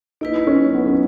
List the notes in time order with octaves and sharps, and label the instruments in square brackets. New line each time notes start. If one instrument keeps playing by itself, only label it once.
[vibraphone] A#3 E4 B4 [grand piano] D#4
[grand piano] C#4
B3
C#4